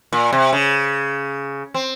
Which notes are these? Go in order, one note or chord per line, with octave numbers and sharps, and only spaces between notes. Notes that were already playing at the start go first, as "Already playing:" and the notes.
A#2
C3
C#3
C4